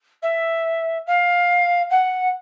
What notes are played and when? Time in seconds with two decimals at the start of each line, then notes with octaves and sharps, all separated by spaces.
0.22 E5
1.06 F5
1.90 F#5